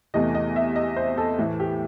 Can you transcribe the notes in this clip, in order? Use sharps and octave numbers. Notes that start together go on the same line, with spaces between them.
E2 C3 E3 A3 D#5
D#5
E5
D#5
C5
A4
A2 E3 A3
G4